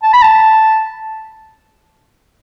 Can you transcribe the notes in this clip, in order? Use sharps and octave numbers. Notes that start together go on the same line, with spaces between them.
A5
B5
A5